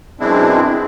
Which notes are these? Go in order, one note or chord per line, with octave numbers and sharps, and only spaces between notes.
F#2 B2 G#3 C4 D4 E4